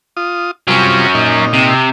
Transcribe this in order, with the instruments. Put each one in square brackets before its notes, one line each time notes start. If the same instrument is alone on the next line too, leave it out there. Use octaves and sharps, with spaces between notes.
[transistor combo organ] F4 D#6
[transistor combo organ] C3 G3 F4 [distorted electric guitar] F#3 C#4
[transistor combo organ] A#2 D#4
[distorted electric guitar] C3